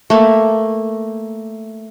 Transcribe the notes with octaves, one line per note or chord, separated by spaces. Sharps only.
A3 A#3